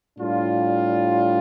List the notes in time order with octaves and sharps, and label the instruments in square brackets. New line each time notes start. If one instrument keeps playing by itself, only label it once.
[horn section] A2 G3 D4 F4